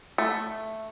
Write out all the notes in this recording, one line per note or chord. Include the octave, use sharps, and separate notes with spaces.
A3